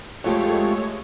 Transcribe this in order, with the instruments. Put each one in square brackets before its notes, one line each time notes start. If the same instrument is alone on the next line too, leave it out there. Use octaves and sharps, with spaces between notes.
[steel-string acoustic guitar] F2 F4 G4 [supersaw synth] G#3 A3 C#5